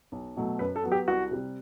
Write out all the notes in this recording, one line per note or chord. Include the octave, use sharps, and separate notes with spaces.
B1
B2 F#3 A3
F#2 B4
A4
F#3 B3
G4
C2 F#4
C3 G3